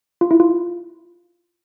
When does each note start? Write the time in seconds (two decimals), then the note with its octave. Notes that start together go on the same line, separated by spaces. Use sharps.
0.21 F4
0.31 E4
0.40 F4